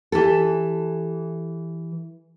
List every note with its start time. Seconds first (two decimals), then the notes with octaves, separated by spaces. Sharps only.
0.12 E3 G4 A4